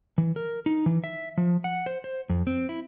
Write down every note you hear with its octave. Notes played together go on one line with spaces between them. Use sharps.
E3
A#4
D#4
E3
E5
F3
F#5
C5
C5
F2
C4
E4